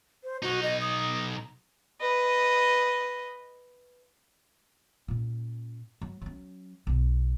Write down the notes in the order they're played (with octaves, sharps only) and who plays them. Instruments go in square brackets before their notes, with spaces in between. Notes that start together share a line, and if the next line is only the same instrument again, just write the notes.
[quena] C5
[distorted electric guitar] B1 D#4 [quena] F#4
[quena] D#5
D#6
[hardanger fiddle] B4 D#5
[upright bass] A#2 C#4
F#3
F#3 C#4
B1 B2